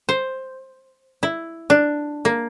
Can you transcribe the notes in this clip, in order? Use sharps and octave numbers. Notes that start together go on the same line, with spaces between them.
C5
E4
D4
A#3